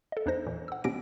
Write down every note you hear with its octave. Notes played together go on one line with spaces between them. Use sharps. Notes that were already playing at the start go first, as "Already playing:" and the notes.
A4 D#5
E2 D4 D#4 C5 A#6
A#2 E3
F#5 E6
B2 B3 C#4 G4 A#6 D7